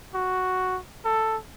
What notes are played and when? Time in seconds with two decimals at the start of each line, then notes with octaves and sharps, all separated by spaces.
0.15 F#4
1.05 A4